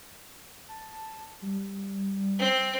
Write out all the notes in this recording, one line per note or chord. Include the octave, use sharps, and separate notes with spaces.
A5
G3
C4